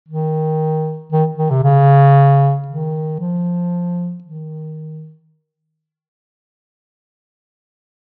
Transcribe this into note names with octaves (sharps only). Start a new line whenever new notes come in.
D#3
D#3
D#3
C3
C#3
D#3
F3
D#3